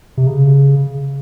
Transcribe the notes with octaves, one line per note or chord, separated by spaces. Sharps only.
C3
C#3